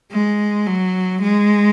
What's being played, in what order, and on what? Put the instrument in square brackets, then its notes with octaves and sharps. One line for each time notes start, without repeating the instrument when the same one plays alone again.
[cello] G#3
F#3
G#3